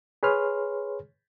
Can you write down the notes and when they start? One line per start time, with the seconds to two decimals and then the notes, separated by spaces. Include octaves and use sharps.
0.23 G#4 B4 C#5 C6 F6